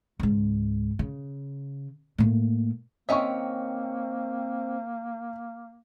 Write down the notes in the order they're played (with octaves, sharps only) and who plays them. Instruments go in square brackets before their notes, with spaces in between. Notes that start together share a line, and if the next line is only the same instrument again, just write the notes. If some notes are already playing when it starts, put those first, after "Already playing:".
[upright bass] C#2 G#2
C#3
A2 A#3
[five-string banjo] D#3 C#4 E5 [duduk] A#3 [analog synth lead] C4 [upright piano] D#5 C#6